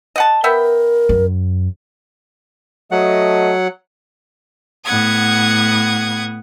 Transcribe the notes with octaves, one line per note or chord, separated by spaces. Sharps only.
D#5 F#5 A5
B3 A#4 E5 G5
F#2
F#3 A3 D#5 F#5
A2 B3 F#5 D#6 G#6